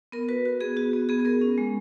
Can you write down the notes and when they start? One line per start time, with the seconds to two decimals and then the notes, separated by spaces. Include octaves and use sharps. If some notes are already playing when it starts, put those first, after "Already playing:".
0.12 B3 A#4
0.28 F#4 B4
0.45 F#4
0.61 B3 G#4
0.76 B3 F#4
0.93 B3
1.09 B3 G#4
1.20 G#4
1.25 B3 A#4
1.41 C#4
1.58 G#3